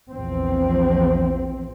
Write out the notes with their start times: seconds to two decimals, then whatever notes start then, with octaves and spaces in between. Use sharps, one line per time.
0.11 A#1 E2 F3 C4